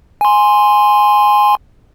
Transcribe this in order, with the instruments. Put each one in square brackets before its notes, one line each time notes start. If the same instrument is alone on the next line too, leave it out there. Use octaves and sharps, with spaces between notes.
[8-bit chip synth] G#5 C6